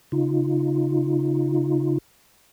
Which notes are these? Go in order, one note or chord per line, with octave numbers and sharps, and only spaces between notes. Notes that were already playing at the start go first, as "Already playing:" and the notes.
C#3 D#4 F4